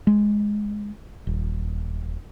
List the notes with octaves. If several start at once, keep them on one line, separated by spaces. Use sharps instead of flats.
G#3
D#1